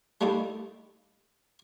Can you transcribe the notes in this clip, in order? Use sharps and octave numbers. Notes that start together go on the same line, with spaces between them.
G3 A3 A#3 D#4 E4 A4